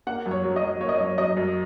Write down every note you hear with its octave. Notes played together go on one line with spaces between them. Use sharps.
A#3 F#5
F#2
C#5
F#3
D#5
F#2
A#3 C#5
D#5
F#2 C#5
F#3 D#5
F#2